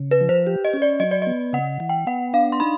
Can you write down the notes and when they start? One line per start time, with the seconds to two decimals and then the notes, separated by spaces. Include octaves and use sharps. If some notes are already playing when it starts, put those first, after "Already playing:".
Already playing: C#3
0.11 B4
0.21 F3
0.29 C5
0.47 G4
0.64 D#5
0.73 C#4
0.82 D5
1.00 F#3 D#5
1.11 D5
1.22 B3 D#5
1.53 C#3 F#5
1.80 E3
1.89 G5
2.07 B3 F#5
2.33 D4 F5
2.52 C6
2.60 D#4 B5